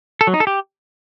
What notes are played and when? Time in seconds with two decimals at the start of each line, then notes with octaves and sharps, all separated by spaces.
0.21 A4
0.27 F#3
0.34 D#4
0.40 A4
0.47 G4